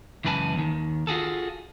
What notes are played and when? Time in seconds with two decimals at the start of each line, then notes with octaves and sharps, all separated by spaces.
0.24 C#2 F#2 E3 B4 G#5 A5
0.55 D#2 D#3
1.07 F4 F#4 G#4 A4